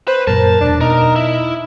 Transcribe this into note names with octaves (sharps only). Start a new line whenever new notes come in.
B4 C5
F#2 A#2 A#4 A5
E1 D4
B2 D#4 A#4
E4